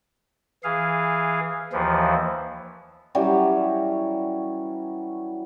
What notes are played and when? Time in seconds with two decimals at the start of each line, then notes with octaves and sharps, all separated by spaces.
0.64 E3 G#4 F5
1.73 D#2 E3 F3
3.15 E3 F#3 G3 C#4